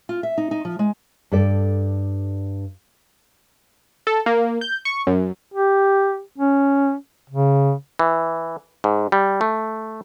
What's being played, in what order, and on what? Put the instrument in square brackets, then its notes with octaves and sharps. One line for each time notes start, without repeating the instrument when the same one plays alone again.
[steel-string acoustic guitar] F4
E5
D#4
D#4
F3
G#3
[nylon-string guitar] G2 A4 D5
[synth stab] A4
A#3
G6
C#6
F#2
[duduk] G4
C#4
C#3
[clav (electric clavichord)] E3
G#2
G3
A3